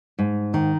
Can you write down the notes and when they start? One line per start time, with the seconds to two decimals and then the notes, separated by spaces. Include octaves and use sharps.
0.19 G#2
0.54 D#3